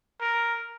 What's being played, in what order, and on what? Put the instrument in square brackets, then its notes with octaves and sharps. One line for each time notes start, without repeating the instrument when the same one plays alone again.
[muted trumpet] A#4